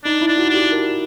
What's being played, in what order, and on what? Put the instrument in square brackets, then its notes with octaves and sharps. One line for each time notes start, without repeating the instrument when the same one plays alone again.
[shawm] D4 [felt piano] D#4
[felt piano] E4
[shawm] D4
[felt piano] F#4
[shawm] D4 [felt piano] G4
[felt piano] A#4